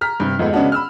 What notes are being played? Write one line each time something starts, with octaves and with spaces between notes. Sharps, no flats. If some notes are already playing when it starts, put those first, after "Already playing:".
A#5 F6 B6
G2 C3
F2 G#2 G#3 A3 B3
C#3 G#3 B3 C#4 D4 F#4
B5 E6 F6